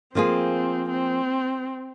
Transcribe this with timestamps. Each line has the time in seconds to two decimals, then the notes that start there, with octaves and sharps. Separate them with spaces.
0.15 F3 A#3 C4 F4 G#4
0.90 C4